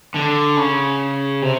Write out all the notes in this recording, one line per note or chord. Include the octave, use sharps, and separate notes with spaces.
D3
C#3
C3